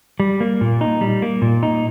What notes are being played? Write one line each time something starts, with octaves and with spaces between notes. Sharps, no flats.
G3
A#3
A#2
D#4
G3
A#3
A#2
D#4